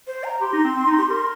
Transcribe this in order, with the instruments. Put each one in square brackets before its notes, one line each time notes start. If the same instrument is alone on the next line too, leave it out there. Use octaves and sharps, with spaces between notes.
[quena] C5
A#5
[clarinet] G4 [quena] C6
[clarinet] D#4
C4
C4
D#4
G4
A#4